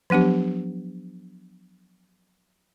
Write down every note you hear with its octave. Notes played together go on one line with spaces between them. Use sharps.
F3 F#3 B3 D4 G4